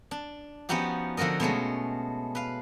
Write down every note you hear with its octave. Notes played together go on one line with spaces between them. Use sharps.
D4
F3 B3 C#4 D#4 F#4 G4
D3 F3 F#4 A#4 D#5
B2 G#3 A3 C#4
B4 F5